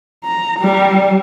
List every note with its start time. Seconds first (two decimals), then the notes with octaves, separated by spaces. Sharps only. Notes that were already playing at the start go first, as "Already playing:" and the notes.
0.24 A#5
0.60 G3